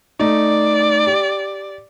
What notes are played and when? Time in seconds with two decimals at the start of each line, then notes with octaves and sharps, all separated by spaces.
0.20 A3 D#4 D5
1.07 G4